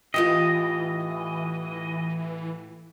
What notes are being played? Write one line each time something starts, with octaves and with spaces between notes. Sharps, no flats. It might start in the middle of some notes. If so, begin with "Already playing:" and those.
A2 E3 F4 G4 D#5